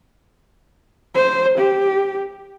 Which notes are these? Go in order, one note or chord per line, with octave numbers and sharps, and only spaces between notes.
C5
G4